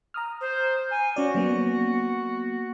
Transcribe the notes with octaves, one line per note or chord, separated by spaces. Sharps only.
A#5 D#6 F6
C5
G#5
C#4 F#4 D5
F#3 A#3 B3